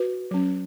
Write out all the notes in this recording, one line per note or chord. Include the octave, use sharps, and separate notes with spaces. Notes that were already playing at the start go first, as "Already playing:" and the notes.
Already playing: F#4 B4
F#3 C#4